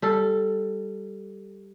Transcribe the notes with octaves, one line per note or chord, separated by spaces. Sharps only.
G3 A4